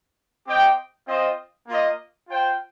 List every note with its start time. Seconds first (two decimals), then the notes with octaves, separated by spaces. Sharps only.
0.47 C4 G4 D#5 G5
1.08 C4 F4 C5 D#5
1.68 A#3 F4 D#5
2.28 F4 C5 G5